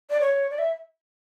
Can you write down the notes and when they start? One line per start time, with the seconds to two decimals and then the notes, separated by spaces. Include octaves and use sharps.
0.10 D5
0.20 C#5
0.51 D5
0.58 E5